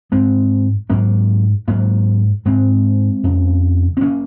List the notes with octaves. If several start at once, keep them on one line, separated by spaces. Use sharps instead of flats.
G#2 G#3 C4
G#2 F#3 A#3
G#2 F#3 A#3
G#2 G#3 C4
F2 C#3
C4
C#3 A#3 C#4